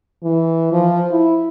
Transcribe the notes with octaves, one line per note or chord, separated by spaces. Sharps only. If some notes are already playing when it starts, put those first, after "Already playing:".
E3
F3
E4